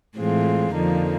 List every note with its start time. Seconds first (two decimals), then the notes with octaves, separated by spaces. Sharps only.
0.17 A2 E3 G#3 C4 F4
0.73 F2 D3 F3 A#3 D#4